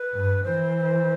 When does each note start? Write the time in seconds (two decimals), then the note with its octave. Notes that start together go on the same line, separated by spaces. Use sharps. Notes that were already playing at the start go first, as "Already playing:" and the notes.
Already playing: B4
0.13 G2
0.44 E3 C5